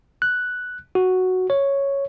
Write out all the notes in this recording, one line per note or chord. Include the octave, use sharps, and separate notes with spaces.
F#6
F#4
C#5